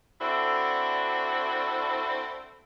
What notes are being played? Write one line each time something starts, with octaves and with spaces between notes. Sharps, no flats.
C4 D4 E4 F#4 A4